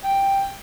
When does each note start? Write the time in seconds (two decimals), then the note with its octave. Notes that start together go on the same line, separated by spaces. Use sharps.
0.04 G5